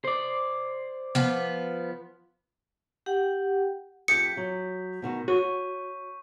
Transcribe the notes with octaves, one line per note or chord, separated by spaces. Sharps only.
C5 D5
F3 B3
G4 F#5 G5
F2 G4 G5 D#6 G6 B6 C#7
F#3
B2 D#3 F#4
F#4 C#5 C#6 D#7